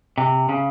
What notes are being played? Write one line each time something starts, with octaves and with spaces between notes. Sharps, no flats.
C3
C#3